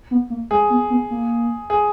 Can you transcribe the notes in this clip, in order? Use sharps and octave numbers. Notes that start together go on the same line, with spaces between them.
B3
A#3
G#3 G#4
B3
B3
A#3
G#4